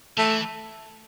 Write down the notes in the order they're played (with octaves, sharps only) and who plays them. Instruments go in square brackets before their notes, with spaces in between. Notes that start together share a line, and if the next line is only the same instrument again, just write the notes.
[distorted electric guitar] E3 [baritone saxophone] A3